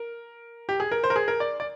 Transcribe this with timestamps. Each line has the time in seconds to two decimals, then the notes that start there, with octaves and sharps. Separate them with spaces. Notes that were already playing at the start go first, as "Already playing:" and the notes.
Already playing: A#4
0.69 G4
0.80 G#4
0.92 A#4
1.04 C5
1.10 A#4
1.16 G#4
1.28 A#4
1.40 D5
1.60 D5